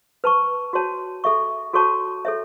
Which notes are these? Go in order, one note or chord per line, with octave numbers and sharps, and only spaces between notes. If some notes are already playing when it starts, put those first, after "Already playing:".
B4 A5 C#6
F#4 C#5 A5
A4 E5 C#6
F#4 A4 C#5 A5 C#6
A4 C#5 E5